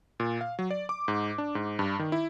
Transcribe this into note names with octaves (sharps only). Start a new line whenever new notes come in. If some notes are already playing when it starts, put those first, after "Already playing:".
A#2
F5
F#3
D5
D6
G#2
D4
G#2
G2
D#3
E4